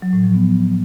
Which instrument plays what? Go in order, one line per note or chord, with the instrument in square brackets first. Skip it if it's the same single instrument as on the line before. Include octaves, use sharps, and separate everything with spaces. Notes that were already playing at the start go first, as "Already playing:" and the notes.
[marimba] F#3
A2
F3
B3